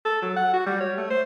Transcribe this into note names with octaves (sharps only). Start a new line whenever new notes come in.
A4
F#3
F#5
F#4
G3
C#5
A3
C5